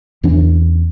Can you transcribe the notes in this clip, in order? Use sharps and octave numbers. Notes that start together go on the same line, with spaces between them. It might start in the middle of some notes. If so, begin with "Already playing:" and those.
E2 E3 C#4 D4